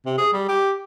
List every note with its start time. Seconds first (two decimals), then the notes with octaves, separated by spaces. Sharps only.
0.06 C3
0.18 G#4
0.33 G3
0.48 G4